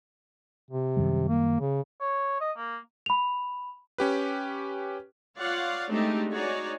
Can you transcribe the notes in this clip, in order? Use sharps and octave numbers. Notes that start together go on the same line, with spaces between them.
C3
F#2 D#3 G3
A#3
C#3
C#5
D#5
A#3
B5 F7
C#4 G4 B4
F4 C#5 D5 F5 F#5
G#3 A3 C4 D4 D#4 G4
D#4 F#4 G#4 C#5 D5